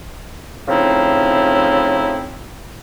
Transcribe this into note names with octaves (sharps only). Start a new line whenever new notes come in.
A2 C#3 F3 C4 D#4 E4